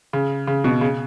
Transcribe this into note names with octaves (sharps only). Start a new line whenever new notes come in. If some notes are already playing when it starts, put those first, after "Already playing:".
C#3
C#3
B2
C#3